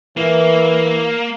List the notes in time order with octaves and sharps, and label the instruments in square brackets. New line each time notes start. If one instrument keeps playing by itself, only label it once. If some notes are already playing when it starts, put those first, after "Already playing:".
[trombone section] E3 [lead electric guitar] A#3